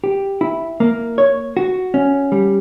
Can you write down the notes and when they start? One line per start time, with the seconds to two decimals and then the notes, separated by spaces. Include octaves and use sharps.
0.04 G4
0.41 E4
0.80 A#3
1.18 C#5
1.57 F#4
1.94 C#4
2.32 G3